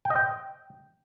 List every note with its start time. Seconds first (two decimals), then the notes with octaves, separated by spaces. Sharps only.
0.05 G5
0.10 D#5
0.16 G5